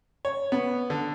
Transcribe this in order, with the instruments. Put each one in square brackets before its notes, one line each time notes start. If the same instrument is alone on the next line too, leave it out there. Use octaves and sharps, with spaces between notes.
[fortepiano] C#5
B3
D3